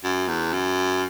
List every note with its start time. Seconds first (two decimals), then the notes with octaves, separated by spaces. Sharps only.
0.04 F#2
0.28 E2
0.53 F#2